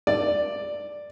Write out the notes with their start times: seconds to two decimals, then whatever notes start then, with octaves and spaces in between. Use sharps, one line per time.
0.07 D5